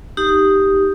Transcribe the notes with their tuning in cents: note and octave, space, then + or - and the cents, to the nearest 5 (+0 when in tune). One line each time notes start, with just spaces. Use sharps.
D#4 +0 G4 +0